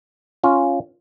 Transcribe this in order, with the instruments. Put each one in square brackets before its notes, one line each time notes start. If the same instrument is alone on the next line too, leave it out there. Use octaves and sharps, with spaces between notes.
[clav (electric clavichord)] C#4 F4